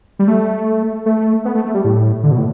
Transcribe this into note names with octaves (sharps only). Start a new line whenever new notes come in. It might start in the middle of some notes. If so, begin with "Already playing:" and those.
G3
A3
A3
B3
A3
A3
G3
A2
D3
B2
A2